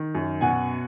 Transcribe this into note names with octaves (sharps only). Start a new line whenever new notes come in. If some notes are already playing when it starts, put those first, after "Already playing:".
Already playing: D#3
F#2
B2 F#5 G#5